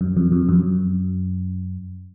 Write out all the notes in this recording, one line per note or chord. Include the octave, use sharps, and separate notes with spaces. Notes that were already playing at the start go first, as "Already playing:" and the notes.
F#2
F2
F2
F#2